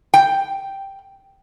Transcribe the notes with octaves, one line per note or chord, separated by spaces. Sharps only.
G5